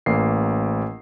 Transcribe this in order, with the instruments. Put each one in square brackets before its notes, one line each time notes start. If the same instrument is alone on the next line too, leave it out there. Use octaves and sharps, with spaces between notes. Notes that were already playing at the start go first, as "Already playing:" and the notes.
[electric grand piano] A1 A#3 C7